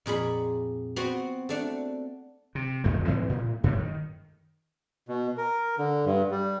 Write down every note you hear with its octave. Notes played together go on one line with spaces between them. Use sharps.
F2 A#2 G#4 B5
B3 C4 F#4
A3 D4 F#5
C3
D1 A#1 F2 A3
G#2 E3 F#3 C4
A2
F#2 A2
D#3
B2
A#4
D3
G2
G3